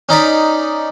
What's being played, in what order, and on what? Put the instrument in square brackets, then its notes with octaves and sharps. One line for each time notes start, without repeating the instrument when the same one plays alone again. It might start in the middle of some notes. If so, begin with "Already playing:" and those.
[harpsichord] C#4 D#4 D5 B5